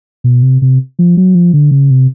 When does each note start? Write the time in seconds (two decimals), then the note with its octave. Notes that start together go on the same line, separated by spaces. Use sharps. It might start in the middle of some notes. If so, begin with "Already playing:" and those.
0.24 B2
0.42 C3
0.62 C3
0.99 F3
1.17 F#3
1.35 F3
1.53 D3
1.71 C#3
1.90 C3